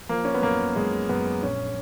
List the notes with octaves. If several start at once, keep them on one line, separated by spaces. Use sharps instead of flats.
F3 A#3
C#4
B3
F#2 A#3
F#2 G#3
F#2 B3
A#1 C#4